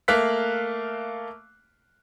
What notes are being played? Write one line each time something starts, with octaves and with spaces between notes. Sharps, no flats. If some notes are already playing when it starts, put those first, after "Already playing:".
A3 A#3 F5 F#6 B6